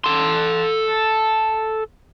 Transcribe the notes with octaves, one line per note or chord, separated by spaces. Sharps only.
A4 C6